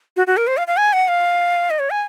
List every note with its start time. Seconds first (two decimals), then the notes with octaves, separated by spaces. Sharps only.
0.17 F#4
0.27 F#4
0.37 A#4
0.47 C5
0.57 F5
0.67 F5
0.77 G#5
0.93 F#5
1.08 F5
1.70 D#5
1.79 C#5
1.90 G#5